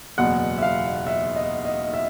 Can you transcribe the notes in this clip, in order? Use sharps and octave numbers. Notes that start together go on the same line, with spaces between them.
F#1 E2 B2 F#3 F#5
E5
F5
E5
D#5
D#5
E5